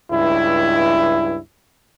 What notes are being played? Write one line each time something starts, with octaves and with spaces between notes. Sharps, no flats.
C#2 G2 E4